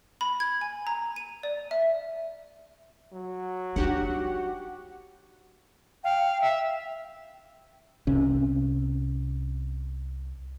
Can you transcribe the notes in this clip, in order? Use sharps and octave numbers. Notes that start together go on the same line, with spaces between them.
B5
G#6
G#5
A#5
D#7
D5
E5
F#3
D4 D#4 F#4 G4 F#5
F5 G5
E5
C2 C3 C#4